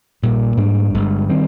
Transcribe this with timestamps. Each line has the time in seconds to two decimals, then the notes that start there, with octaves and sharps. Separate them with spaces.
0.22 A#1 A#2 G3
0.57 G#2 G3 A#3 D4
0.94 G1 G2 D3 G#3
1.29 D#3 G3 C4